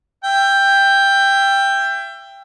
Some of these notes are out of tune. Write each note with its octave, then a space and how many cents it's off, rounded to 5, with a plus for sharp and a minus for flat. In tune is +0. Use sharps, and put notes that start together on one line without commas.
E5 +30 G5 +10